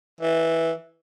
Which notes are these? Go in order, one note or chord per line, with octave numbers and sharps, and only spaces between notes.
E3